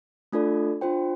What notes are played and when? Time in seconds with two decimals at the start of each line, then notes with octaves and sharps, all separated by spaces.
0.32 A3 D4 F4 A4 D5
0.81 D4 F4 C5 G5